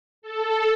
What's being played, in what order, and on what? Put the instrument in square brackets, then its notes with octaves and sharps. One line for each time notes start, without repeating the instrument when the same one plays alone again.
[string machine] A4